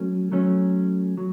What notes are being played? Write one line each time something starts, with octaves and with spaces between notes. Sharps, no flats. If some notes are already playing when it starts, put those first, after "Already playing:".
Already playing: F#3 A3 C#4
F#3 A3 C#4
F#3